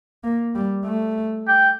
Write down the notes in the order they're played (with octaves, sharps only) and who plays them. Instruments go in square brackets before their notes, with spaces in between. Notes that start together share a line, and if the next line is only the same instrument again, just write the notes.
[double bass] A#3
G3
A3
[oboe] G5